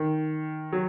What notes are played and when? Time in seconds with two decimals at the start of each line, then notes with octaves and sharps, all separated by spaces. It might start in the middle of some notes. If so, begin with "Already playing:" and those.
Already playing: D#3
0.72 F#3